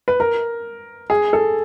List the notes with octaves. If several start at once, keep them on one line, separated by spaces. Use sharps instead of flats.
B4
A#4
G#4
A4